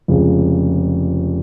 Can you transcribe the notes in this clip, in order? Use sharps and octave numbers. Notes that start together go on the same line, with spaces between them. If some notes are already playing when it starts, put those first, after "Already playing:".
F1 F2 C#3 F3 G#3